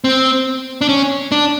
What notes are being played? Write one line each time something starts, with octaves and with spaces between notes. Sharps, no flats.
C4
D4
C#4
D4